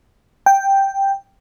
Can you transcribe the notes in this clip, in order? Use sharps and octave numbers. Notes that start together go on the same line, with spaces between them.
G5